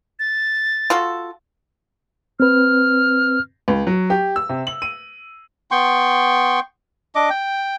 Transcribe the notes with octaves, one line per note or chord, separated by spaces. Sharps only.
A6
F4 F#4 A4
C4 B4 F6
C#2
F#3
G4
E6
C3
F#7
D#7
B3 G5 C6 C#6
D4 D#5 D6
G5